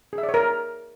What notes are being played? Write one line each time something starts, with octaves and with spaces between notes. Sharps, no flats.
G#4
E5
D5
C#5
A#4